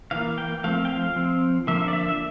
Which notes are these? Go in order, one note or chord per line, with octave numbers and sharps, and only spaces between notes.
E3 A#3 F5
G5
F3 A3 C4 F5
G5
F5
F3 C4
D3 F3 A#3 E5
D5
E5
E5